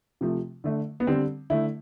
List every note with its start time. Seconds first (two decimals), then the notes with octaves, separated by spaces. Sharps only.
0.21 C3 F3 A3
0.64 D3 A3
1.00 B3
1.07 D3 G3 C4
1.50 D3 A3 E4